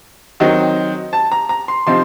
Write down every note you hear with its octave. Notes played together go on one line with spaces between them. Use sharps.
D#3 F#3 C4 D#4
A5
A#5
A#5
C6
C3 F3 C4 D#4 C6